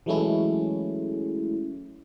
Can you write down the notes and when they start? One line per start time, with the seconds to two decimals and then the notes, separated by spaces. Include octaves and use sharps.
0.06 E3 F#3 G#3 A3 C#4 E4